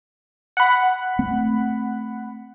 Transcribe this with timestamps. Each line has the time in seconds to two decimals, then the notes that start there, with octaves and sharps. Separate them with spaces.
0.57 F#5 B5
1.19 A3 C4